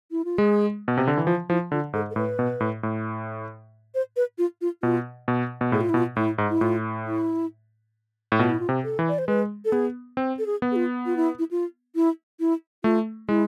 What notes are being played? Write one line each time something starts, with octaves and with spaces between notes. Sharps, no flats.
E4
F4
G#3 G#4
B2
C3
D3
E3
F3 F4
F3 E4
D3 F4
G#2 A4
A4
A2 B4
B2
A2
A2
C5
B4
F4
F4
B2 F4
B2
B2
A2 G#4
F4
E4
B2
F4
A2 E4
G#2
E4
A2 F4
E4
A2
B2 F4
E4
F4
C3
A4
E3
D5
C5
G#3 B4
A4
B3 G#4
C4
A4
G#4
B3
G#4
F4
F4
E4
E4
F4
E4
E4
A3 F4
G#3 E4